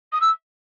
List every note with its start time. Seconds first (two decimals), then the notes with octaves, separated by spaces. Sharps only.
0.12 D#6
0.20 E6